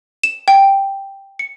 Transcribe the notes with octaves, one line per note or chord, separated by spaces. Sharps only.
E7
G5
C#7